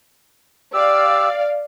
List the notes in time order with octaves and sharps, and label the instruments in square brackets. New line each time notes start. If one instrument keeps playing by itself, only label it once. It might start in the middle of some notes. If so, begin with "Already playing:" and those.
[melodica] G4 E6 [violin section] D5 F5